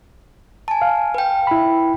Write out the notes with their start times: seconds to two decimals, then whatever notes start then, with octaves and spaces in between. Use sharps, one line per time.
0.68 G#5 A5
0.82 F5
1.14 B4 G5
1.47 E4 B5